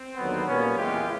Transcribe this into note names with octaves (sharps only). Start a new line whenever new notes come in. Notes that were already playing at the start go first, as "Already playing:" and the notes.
Already playing: C4
D#2 D3 F#3 B3
A#2 G3 A#3 B3 C#4
E2 C#3 E3 G#3 F4 G4